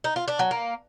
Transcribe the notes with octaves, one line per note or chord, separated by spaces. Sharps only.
D#4
F4
D4
F#3
A#3